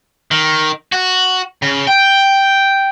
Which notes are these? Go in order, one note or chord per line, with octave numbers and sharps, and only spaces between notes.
D#3
F#4
C#3
G5